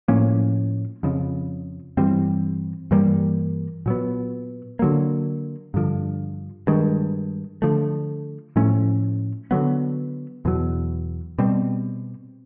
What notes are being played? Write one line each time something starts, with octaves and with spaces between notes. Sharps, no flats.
A2 F3 A#3 C#4
F2 C#3 F3
G2 E3 G3 C4
G2 E3 G3 A#3
A#2 F#3 B3
D3 F#3 A#3
G2 D3 F3
G2 D#3 G#3
D3 F3 A3
A2 F3 A3 C#4
D3 F#3 B3
E2 B2 F#3
B2 G3 C4